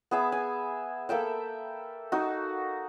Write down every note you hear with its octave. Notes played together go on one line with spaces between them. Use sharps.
B3 G#4 E5
G#5
A#3 A4 E5 G5
D#4 F#4